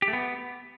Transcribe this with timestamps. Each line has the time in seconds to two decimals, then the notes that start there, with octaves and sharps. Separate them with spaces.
0.02 G4
0.08 A3
0.13 B3